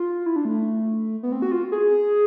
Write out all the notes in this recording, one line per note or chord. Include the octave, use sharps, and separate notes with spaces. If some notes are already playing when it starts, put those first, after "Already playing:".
Already playing: F4
E4
D4
A3
B3
C4
F#4
F4
G#4